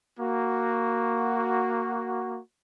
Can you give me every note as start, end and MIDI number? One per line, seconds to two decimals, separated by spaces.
0.19 2.40 58
0.19 2.40 66